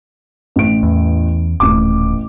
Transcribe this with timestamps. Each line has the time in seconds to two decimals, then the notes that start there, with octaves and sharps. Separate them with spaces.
0.56 A1 D7
0.83 E2
1.60 D#1 A1 D6